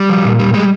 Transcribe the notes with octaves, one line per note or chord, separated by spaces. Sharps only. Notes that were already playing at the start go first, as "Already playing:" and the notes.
Already playing: G3
F3
A#2
G3
G3 G#3